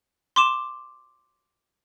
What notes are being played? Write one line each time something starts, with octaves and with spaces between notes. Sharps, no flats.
C6 D6 E7